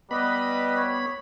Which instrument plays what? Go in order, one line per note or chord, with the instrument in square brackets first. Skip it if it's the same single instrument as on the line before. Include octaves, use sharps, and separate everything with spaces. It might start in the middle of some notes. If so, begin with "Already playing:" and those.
[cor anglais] G3 [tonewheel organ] B3 B5 [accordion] B4 D#5
[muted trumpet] C#5